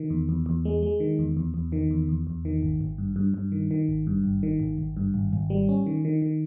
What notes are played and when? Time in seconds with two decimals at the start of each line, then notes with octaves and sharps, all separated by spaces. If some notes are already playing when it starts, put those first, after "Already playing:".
Already playing: D#3
0.10 E2
0.29 E2
0.46 E2
0.65 G#3
0.83 G#3
1.00 D#3
1.19 E2
1.37 E2
1.54 E2
1.72 D#3
1.91 E2
2.09 E2
2.27 E2
2.45 D#3
2.63 G#1
2.81 G#1
2.98 G2
3.16 G2
3.34 G2
3.52 D#3
3.71 D#3
3.88 G#1
4.07 G2
4.24 G#1
4.43 D#3
4.60 G#1
4.78 G#1
4.97 G2
5.14 G#1
5.33 G#1
5.50 G3
5.69 C#4
5.86 D#3
6.05 D#3
6.22 D#3